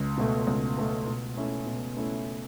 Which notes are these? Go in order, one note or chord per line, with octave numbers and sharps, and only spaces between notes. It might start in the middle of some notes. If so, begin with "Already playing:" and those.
Already playing: C#2
B2 A3
C#2
B2 A3
B2
A3 C#4 E4
B2
A3 C#4 E4